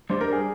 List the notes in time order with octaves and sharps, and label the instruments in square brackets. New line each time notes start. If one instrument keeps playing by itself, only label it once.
[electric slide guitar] G3 D4 G4 [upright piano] C5
[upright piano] A#4
G#4